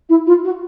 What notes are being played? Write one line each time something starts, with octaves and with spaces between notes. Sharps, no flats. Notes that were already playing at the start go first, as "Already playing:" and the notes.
E4
F4
F#4